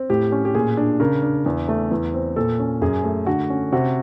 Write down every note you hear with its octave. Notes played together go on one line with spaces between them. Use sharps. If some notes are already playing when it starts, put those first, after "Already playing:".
Already playing: C4
A2 G4
C#4
G4
A#2 G#4
D4
C#3 A#4
D4
E2
A3
E2
C4
A#2 A4
C#4
F#2 G#4
A3
D3 F#4
C#4
C3 F#4